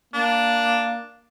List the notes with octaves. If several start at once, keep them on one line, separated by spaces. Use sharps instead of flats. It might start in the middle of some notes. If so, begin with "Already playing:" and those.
A#3 D4